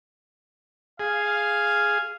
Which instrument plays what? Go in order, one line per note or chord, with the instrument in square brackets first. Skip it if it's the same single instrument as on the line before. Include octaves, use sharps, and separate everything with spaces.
[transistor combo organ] G#4 [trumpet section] F5